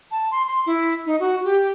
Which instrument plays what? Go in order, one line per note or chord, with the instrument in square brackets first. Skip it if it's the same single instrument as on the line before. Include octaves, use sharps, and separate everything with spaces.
[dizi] A5
C6
C6
E4
D#4
F#4
G4